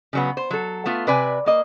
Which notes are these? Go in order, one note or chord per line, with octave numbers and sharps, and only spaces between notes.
C#3 F#3 B3
C5
F#3 A4
A3 B3 F4
C3 B4 D5 G#5
A#3 D#5